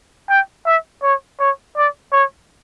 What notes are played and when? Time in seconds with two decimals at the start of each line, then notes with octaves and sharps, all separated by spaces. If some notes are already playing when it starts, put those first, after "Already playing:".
0.29 G5
0.66 E5
1.03 C#5
1.39 C#5
1.77 D5
2.13 C#5